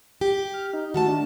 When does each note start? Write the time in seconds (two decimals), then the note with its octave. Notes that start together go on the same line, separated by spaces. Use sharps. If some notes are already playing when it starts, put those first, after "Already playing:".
0.21 G4
0.53 F6
0.73 D#4
0.94 D#3 A3 F#4 A5
1.07 D4